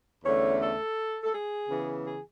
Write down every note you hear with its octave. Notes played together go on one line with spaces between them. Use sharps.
E2 D3 A3 C#4 C#5
A4
A4
G#4
C#3 E3 B3
G#4